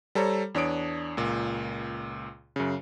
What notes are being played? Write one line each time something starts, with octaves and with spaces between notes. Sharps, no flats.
G3 A4 C5 C#5 A#5
E2 D4 C#5 D#6 D7
C#2 A#2
F#2 C#3